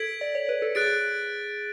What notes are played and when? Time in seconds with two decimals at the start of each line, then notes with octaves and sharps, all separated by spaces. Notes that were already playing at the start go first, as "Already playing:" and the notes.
Already playing: A4 G#6 B6 D7 F#7
0.21 D5
0.35 C#5
0.49 B4
0.62 A4
0.75 G#4 F#6 A6 D7